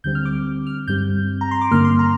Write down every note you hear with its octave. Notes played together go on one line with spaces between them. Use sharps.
D2 D3 G3 C4 G6
F6
D6
F6
G2 G3 C4 G6
A#5
C6
D6
G2 D3 A#3 F6
C6
A#5